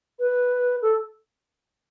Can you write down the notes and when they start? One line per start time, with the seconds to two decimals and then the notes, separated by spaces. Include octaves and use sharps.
0.19 B4
0.82 A4